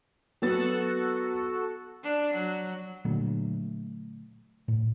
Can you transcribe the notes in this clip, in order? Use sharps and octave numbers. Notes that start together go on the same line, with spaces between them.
F#3 B3 F#4 A4 A6
D4
F#3
A#2 D3 F#3 A3
A2